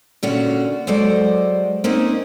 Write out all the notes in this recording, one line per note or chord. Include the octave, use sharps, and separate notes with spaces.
A#2 D3 C#4 F4 F#4
F#3 G#3 A4 C5 D5
A#3 C4 C#4 D#4